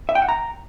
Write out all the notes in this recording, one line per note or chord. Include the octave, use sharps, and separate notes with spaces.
E5
G5
F#5
A#5